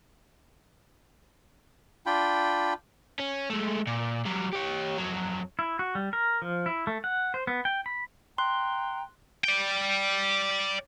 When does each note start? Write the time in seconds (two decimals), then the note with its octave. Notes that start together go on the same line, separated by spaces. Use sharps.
2.06 D4 F4 G5 B5
3.19 C#4
3.50 G#3 A3
3.87 A#2
4.26 F#3 G3
4.53 G4 C#5
4.98 F2 F#3
5.59 E4
5.79 F#4
5.95 G3
6.13 A#4
6.42 F3
6.66 E4
6.87 A3
7.04 F#5
7.34 C5
7.47 B3
7.65 G5
7.86 B5
8.38 G5 A#5 C6 F#6
9.44 D5 G5